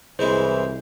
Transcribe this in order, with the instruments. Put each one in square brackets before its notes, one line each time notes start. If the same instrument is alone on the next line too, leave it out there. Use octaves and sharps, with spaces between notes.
[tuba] C2 [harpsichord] C#3 G#3 E4 [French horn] E3 [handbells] C5